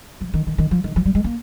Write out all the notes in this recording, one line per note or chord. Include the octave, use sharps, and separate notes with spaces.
F3
D#3
D#3
D#3
F3
D#3
F3
G3
G#3
A#3